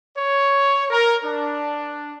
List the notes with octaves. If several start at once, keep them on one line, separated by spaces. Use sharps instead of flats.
C#5
A#4
D4